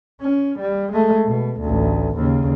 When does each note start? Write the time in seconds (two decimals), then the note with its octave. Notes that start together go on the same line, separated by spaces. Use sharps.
0.21 C#4
0.59 G3
0.92 G#3 A3
1.25 B2
1.61 A1 D2
2.16 D#2 C#3